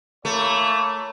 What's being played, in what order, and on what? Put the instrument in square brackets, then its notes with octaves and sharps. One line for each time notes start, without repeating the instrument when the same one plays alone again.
[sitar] A3 [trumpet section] A#3 E4 C#5